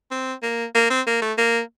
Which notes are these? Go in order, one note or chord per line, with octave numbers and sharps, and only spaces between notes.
C4
A#3
A#3
C4
A#3
A3
A#3